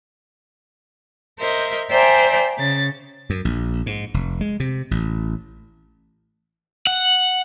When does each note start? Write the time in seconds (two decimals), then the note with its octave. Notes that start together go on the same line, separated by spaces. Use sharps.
1.39 A#4 C5 D#5 E5
1.90 C5 D5 E5 G5 G#5 A#5
2.57 C#3 A6
3.30 F#2
3.45 A#1
3.86 G#2
4.14 F1
4.41 G#3
4.60 C3
4.91 A1
6.87 F#5